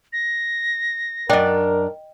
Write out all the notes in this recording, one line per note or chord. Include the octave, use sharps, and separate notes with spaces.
A#6
F#2 D4 A#4 D#5 G5